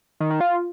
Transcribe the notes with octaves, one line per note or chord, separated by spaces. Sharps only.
D#3
D#3
F4